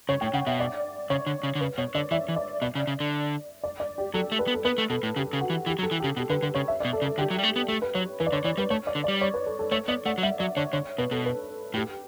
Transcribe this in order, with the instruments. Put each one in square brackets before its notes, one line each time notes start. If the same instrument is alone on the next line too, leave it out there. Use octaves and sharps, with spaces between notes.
[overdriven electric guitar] C#3 [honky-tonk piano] C#5
[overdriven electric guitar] A2 [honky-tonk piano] G5
[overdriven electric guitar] C#3 [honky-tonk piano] F#5
[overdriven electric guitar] B2 [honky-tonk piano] E5
[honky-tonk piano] D5
[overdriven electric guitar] C#3 [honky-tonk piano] C#5
[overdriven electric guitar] D3
C#3
D3
[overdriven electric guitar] C#3 [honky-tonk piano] B4
[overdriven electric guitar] B2 [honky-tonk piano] C#5
[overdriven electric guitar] D3 [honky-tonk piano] D5
[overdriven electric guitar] E3 [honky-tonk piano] E5
[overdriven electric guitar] E3
[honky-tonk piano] D5
[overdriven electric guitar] B2 [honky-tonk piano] D5
[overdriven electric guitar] C#3
C#3
D3
[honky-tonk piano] D5
D5
G4
[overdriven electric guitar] F#3 [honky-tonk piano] A4
[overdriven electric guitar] A3
[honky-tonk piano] B4
[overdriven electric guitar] B3
[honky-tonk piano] A4
[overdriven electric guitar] B3 [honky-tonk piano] B4
[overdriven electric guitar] A3
[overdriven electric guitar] B2 [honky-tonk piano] A4
[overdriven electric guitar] A2
[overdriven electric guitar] C#3 [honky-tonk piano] G4
[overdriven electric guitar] C#3
[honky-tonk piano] F#4
[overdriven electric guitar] E3
[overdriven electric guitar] E3 [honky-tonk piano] G4
[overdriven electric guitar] F#3
[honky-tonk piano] A4
[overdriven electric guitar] E3
[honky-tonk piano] G4
[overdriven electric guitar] C#3
[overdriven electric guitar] B2 [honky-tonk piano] G4
[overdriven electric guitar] D3 [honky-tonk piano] B4
[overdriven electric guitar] D3 [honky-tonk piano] B4
[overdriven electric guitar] C#3 [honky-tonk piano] C#5
[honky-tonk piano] E5
D5
[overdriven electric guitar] B2
[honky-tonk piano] A4
[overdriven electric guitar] C#3
[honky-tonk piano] A4
[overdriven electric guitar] D3 [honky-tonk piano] G4
[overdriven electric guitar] F#3
G3
A3
B3
[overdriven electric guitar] A3 [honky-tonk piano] G4
[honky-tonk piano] B4
[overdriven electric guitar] F#3 [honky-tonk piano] C#5
[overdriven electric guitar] E3 [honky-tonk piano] B4
[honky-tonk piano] D5
[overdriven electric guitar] D3 [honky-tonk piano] C#5
[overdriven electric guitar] E3 [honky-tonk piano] C#5
[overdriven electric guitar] G3 [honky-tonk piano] B4
[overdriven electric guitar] A3 [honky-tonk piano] C#5
[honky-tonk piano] D5
[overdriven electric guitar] D3
[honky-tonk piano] D5
[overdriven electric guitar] G3
[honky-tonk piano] C#5
B4
A4
A4
[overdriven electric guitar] A3 [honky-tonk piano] C#5
[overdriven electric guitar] B3 [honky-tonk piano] D5
[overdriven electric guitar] A3 [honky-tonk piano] F#5
[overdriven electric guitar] F#3
[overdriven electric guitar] G3 [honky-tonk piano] E5
[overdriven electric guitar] F#3 [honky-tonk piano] D5
[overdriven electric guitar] D3 [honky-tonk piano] C#5
[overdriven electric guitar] D3 [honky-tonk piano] C#5
[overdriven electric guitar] B2 [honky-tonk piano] B4
[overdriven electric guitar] B2 [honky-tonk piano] A4
[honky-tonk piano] B4
[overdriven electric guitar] A2 [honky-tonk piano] G4